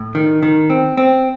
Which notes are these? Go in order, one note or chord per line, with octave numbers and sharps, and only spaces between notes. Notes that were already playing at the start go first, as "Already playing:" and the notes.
Already playing: A2
D#3
D#3
C4
C4